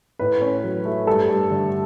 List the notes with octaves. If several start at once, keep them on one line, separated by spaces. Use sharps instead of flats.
A2 B4
C#4
F#3
A3
G2 A4
G2
D3